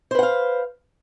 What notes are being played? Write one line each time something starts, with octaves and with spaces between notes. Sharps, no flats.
B4 C5 F5 F#5